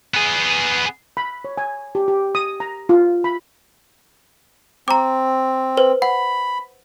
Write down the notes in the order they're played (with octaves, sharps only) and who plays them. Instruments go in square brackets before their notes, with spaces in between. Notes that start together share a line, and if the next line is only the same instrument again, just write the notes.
[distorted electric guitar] B3 G#4
[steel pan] B5
C#5
G#5
G4
G4
D#6
A#5
F4
B5
[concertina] C4 [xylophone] A#5 D6
[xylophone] B4 C5
[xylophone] F#5 [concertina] B5